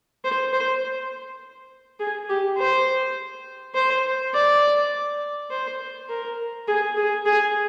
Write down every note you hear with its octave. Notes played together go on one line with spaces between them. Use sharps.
C5
C5
G#4
G4
C5
C5
D5
C5
A#4
G#4
G#4
G#4